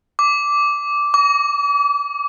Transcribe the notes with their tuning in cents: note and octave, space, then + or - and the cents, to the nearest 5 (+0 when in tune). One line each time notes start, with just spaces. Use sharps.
D6 -10
D6 -40